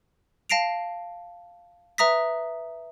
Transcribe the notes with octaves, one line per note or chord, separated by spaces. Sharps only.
F5 A5 A#6 C7 D7 F7
B4 E5 A#5 D#6 A#6 B6